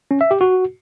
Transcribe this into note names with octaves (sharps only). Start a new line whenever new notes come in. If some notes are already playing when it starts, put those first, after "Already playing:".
C#4
E5
G4
F#4